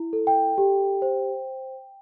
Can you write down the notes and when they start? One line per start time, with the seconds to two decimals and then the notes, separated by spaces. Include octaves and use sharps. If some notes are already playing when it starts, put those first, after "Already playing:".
Already playing: E4
0.13 A4
0.27 G5
0.58 G4
1.02 C5